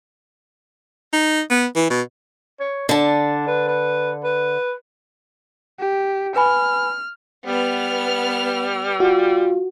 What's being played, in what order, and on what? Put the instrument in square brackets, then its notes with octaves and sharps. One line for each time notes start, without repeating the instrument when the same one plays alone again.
[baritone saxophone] D#4
B3
E3
B2
[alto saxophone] C#5
[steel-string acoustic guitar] D3 A5 [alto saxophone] D4
[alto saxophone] B4
B4
B4
[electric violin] G4
[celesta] B4 G#5 B5 [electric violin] F6
[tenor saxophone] G3 [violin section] B3 F6
[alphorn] F4 [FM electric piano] F#4